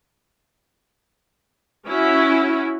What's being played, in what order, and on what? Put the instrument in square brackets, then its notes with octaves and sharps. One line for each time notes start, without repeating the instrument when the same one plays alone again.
[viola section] C#4 E4 F#4